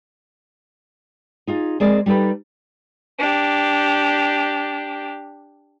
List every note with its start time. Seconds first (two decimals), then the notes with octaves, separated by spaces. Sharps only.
1.47 D#4 F4 G#4
1.80 G#3 C4 G#4 A#4 D5
2.06 G3 D#4 G4 A4 B4
3.19 D4 G4